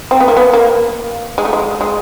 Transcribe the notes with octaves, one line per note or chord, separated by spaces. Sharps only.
C4
B3
A#3
B3
A#3
G#3
A3
G#3
G#3